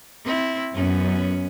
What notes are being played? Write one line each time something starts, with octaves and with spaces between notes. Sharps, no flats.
C4 E4
F#2 B3 C#4